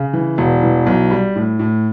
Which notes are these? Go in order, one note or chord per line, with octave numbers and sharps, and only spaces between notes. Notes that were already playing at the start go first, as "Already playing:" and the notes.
Already playing: C#3
E3
E1
E3
B1
G3
A2
A2